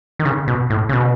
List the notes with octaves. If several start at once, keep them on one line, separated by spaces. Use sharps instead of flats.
D#3
C#3
B2
A2
C#3
B2